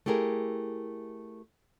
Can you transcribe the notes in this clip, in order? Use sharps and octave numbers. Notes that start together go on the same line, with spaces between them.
A3 E4 G4 G#4 A#4